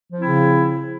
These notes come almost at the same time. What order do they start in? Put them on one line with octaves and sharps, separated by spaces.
F3 C4 E4 C#3